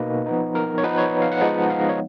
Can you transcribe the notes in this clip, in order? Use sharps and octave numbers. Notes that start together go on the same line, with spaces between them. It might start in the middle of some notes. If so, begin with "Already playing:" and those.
Already playing: B2 A#3 D#4 B4 D#5
F3 B3 D#4
A#4
C#5
F3 B3 D#4 B4
C#5
F5
F#5
F3 G#3 B3 D#4
F5
D#5
C#5